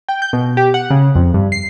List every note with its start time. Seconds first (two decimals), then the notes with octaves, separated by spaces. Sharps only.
0.09 G5
0.22 G6
0.33 B2
0.57 G4
0.74 F#5
0.90 C#3
1.15 F2
1.34 G2
1.52 C7